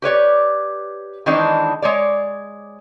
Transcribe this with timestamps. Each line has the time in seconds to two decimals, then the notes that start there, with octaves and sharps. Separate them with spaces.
0.02 G4 B4 C#5 D5
1.26 D#3 E3 G#3 C4 D4 D#4
1.82 G#3 C#5 D5